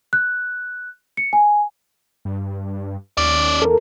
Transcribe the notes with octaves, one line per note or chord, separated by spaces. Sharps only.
F#6
C#7
G#5
G2
D#2 C#4 D5
E2 A4 A#4